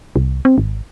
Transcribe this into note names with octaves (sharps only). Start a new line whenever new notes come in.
C2
C4
G#1